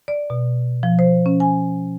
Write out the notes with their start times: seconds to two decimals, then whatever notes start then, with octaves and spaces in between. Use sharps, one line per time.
0.08 D5
0.30 B2
0.83 F3
0.99 C5
1.26 C#4
1.40 G#5